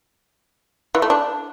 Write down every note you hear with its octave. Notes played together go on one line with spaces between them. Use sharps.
E3
A3
D4